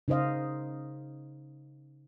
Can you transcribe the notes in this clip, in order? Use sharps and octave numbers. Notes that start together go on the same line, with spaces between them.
C#3 D#4 C5 D#5 F5